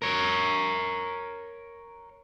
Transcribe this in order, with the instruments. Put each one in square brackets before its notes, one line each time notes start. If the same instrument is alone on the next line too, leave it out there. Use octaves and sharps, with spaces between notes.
[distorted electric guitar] A#4 C#5